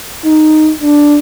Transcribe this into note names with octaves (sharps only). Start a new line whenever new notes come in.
D#4
D4